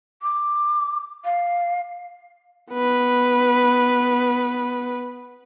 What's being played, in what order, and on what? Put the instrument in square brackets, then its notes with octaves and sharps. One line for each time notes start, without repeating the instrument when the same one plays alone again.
[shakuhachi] D6
F5
[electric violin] B3 B4